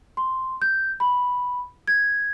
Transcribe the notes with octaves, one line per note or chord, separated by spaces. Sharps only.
C6
G6
B5
G#6